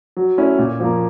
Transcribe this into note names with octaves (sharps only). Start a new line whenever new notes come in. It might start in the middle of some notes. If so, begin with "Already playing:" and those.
F#3
A3 C#4 E4
A#2
F3 A#3